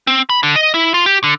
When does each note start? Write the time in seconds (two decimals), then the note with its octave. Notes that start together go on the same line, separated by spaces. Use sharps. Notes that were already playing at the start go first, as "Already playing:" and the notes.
0.07 C4
0.30 B5
0.43 D3
0.56 D#5
0.74 E4
0.94 F4
1.06 G4
1.24 D3